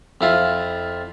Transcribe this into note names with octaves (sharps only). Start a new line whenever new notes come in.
F2 E4 F4